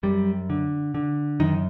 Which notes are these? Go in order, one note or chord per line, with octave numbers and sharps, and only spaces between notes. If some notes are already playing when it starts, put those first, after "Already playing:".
F#2 G3
D3
D3
F#2 D#3